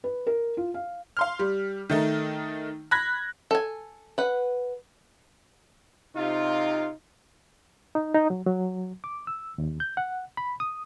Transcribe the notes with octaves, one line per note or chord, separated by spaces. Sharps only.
B4
A#4
F4
F5
F5 C6 F6
G3
D#3 A3 D#4
B5 F#6 G#6 A#6
A4 G#5
B4 F#5
C3 D#4 F4
D#4
D#4
F#3
F#3
D6
E6
D#2
G6
F#5
B5
D#6